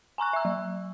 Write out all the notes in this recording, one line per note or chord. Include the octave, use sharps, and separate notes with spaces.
G#5 A#5 C#6 F#6
E5 E6
F#3